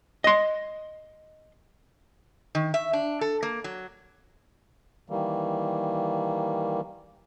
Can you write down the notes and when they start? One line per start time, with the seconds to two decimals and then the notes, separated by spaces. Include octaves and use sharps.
0.24 D#5 C6
2.55 D#3
2.74 E5
2.93 D4
3.21 A4
3.43 A#3
3.64 F#3
5.10 D#3 E3 G3 A#3